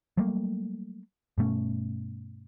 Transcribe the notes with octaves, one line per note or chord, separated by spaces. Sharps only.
F#3 G3 A3 A#3
G2 B2 A3 C#4